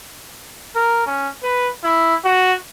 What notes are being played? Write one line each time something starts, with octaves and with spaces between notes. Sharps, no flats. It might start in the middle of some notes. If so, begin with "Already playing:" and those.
A#4
C#4
B4
E4
F#4